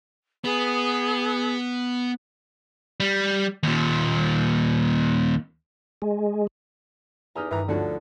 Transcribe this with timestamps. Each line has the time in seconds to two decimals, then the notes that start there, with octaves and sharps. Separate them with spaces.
0.44 B3 G#4
3.00 G3
3.63 D#2 A#2
6.02 G#3
7.36 E2 D#4 G4 G#5 A#5 D#6 F6
7.51 G2 D#3 E3 A#5
7.68 D2 D3 F3 D4 F#4 C#5